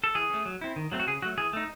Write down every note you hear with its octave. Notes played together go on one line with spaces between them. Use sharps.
A4
E3 G#4
A3 C#4
F#3
C4 E4
D#3
F#3 A3 C4
F#4
C#3 G#4
F#3 A3 F#4
E3 G#4
A3 D#4